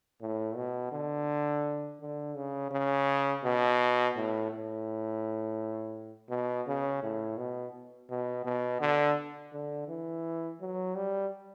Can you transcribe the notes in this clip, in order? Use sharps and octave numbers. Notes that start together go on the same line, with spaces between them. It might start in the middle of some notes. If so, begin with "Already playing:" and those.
A2
B2
D3
D3
C#3
C#3
B2
A2
A2
B2
C#3
A2
B2
B2
B2
D3
D3
E3
F#3
G3